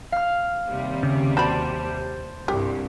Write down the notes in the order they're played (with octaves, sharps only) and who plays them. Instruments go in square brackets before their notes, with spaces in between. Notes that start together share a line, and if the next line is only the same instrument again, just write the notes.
[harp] F5 F6
[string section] D#2 C3 G3
[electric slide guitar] C#3
[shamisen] F#4 D5 B5 [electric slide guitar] C5 A5
[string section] C2 G2 [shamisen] G4